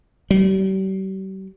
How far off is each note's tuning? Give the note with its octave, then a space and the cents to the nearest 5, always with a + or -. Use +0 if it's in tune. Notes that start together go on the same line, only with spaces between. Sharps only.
G3 -40